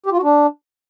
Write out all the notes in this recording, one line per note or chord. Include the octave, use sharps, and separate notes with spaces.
G4
F4
F#4
D4